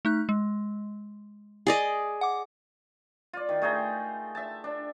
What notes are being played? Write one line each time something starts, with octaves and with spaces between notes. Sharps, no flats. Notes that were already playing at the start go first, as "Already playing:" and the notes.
A3 D#4 F#6
G#3
G#4 D5 D#5
F#5 D6
F4 D5
D#3
A3 G#4 G5 A#5
E5 A5
D4